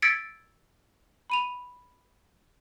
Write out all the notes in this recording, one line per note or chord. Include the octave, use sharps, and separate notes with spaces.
E6 G#6 A6 B6 C#7 D7
B5 D#7 F7